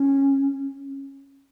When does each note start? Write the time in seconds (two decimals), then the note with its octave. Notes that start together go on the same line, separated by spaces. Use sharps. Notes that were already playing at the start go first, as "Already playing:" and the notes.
Already playing: C#4